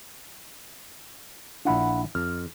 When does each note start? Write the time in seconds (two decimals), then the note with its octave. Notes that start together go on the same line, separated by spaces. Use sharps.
1.65 A#1 D4 E4 F4 F#5 B5
2.15 F2 F6